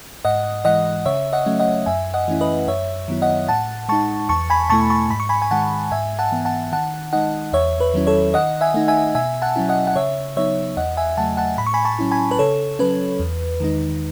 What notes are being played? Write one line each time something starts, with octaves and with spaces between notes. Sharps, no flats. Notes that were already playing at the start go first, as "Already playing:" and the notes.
G#2 D#5 F#5
E3 G#3 D#5 F#5
C#3 C#5 E5
D#5 F#5
F#3 A3 C#4
D#5 F#5
F#2 E5 G#5
D#5 F#5
E3 A3 C#4 E4
B4 D#5
F#2 C#5 E5
D#3 F#3 B3 E4
D#5 F#5
A2 F#5 A5
G#3 D#4 A5 C#6
E2 A5 C#6
G#5 B5
B2 A3 E4 A5 C#6
A5 C#6
G#2 B5
C#6
G#5 B5
G#5
D#3 G#3 F#5 A5
G#2 E5 G#5
F#5 A5
E3 B3
F#5 A5
D#3 F#5 A5
G#3 D#4 D#5 F#5
E2 C#5 E5
B4
D#3 F#3 C#4 E4
A4 C#5
D#3 D#5 F#5
E5 G#5
A3 D#4
E5 G#5
B2 E5 G#5
F#5 A5
F#3 C#4 E4
D#5 F#5
F#5
C#3 C#5 E5
F#3 B3 D#4 C#5 E5
E2 D#5 F#5
E5 G#5
C#3 F#3 A3 F#5 A5
F#5 A5
A2 B5
C#6
G#5 B5
A5 C#6
F#3 C#4 E4
G#5 B5
B4
C#3 A4 C#5
F#3 C#4 B4
E2
D#3 G#3 D#4